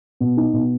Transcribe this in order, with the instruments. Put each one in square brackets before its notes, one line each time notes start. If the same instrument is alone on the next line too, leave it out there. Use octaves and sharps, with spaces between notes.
[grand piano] B2
D#4
B2